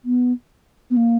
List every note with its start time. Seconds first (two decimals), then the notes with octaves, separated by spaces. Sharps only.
0.05 B3
0.90 B3
0.96 A#3